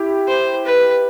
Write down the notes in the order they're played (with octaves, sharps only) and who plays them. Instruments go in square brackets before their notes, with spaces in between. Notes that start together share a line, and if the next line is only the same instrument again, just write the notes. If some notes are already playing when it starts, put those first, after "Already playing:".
Already playing: [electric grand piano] E4 G4
[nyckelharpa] C5
B4